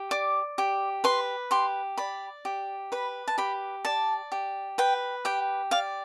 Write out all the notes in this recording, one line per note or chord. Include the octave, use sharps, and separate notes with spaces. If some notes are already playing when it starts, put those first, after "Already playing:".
Already playing: G4
D5 D6
G4
B4 C6
G4 C6
D5 B5
G4
B4 B5
A5
G4 B5
D5 A5
G4
B4 G5
G4 G5
D5 F5